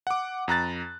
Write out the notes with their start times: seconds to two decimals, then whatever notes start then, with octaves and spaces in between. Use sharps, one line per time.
0.07 F#5 D6
0.48 F2 A#5 F#6 A6